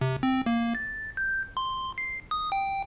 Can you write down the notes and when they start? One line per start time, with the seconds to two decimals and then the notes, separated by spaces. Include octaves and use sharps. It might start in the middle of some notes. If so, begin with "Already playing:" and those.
0.01 C3
0.23 C4
0.46 A#3
0.75 A6
1.17 G6
1.57 C6
1.98 C7
2.31 D#6
2.52 G5